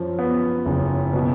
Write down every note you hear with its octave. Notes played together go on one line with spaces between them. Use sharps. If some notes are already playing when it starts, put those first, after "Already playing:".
Already playing: F#2 F3
B3
F#1
B2